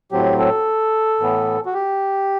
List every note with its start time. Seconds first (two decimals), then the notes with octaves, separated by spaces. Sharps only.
0.12 A2 F#3 C4 G4
0.39 A4
1.20 A2 E3 B3
1.66 F#4
1.74 G4